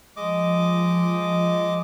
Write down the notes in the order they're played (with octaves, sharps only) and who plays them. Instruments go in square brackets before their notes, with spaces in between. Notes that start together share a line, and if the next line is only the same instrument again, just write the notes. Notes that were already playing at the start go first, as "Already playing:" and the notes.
[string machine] F3 [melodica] G#3 D#5 D6